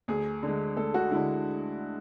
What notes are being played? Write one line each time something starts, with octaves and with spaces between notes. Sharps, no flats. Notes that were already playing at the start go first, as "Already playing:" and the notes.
D2 G#4
D3 G#3
D2 A4
F#4
D3 G#3 E4